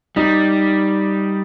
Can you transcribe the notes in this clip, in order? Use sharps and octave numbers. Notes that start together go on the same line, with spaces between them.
G3 D#4